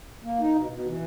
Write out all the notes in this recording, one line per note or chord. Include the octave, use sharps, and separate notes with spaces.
A#3
D#4
B2
B2
E3